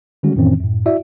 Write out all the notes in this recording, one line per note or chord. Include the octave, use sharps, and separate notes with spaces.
D3 D#3 G3 G#3 C#4 F#4
F2 A2 D#3 E3 C4 C#4
F#2 A2
E4 F#4 D5 E5